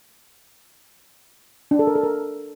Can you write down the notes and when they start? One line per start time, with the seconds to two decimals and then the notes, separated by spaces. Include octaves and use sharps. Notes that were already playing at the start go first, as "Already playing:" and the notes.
1.71 D4
1.79 A4
1.87 A#4
1.95 A4
2.03 A#4